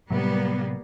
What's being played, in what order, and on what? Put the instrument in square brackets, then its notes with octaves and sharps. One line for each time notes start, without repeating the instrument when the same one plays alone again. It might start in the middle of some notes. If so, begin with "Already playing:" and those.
[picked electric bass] A2 C3 F#3 [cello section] G3 A#3 B3